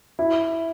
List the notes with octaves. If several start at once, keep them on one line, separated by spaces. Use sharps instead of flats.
E4